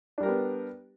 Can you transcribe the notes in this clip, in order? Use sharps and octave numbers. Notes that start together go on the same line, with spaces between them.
G3 B3 D4 G4 A#4